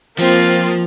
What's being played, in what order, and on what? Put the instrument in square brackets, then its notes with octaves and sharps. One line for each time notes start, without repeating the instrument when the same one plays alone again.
[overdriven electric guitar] F3 [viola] A#3 F4 [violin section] C4